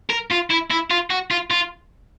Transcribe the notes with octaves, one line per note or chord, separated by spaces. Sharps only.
A#4
F4
E4
E4
F4
F#4
F4
F4